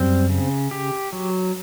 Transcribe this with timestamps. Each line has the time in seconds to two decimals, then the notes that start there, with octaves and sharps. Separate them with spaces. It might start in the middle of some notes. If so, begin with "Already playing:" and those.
Already playing: F#2 G3 C4
0.29 C#3
0.71 G4
1.13 F#3